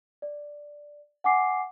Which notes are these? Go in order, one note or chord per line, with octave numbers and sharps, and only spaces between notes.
D5
F#5 G#5 D6 C7